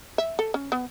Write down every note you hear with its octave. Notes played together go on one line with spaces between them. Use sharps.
E5
A4
C#4
B3